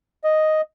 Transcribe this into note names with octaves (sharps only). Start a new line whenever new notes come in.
D#5